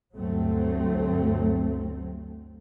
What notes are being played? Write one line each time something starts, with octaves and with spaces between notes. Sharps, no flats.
G1 D2 G2 F#3 A3 C4